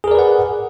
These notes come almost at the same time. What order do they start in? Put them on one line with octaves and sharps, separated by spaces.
G#4 A#4 D5 B4 F#5